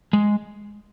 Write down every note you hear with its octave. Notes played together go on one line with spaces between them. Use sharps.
G#3